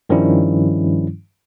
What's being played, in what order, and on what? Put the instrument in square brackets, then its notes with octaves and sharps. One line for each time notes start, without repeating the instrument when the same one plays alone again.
[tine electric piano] G2 D#3 F3 G3 C#4 E4